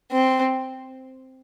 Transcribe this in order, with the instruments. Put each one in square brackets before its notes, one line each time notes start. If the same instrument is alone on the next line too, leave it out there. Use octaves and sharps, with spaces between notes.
[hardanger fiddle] C4